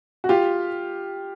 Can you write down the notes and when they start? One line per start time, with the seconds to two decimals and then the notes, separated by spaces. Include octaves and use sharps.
0.24 F#4
0.29 F4 G4